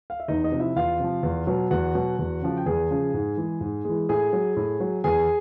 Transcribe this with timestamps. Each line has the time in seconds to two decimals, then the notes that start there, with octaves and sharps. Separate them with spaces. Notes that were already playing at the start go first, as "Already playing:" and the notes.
0.10 F5
0.20 E5
0.28 E2 D#4 D#5
0.44 D#4 D#5
0.52 C3 F3
0.60 E4 E5
0.76 E2 F4 F5
0.99 C3 F3
1.23 E2
1.47 B2 F#3
1.71 E2 F#4 F#5
1.95 B2 F#3
2.19 E2
2.42 C#3 F3
2.57 G5
2.66 E2 G#4 G#5
2.90 C#3 F3
3.14 G#2
3.37 E3 G#3
3.61 G#2
3.85 E3 G#3
4.09 A2 G#4 G#5
4.33 F#3
4.57 A2
4.80 F#3
5.04 E2 G#4 G#5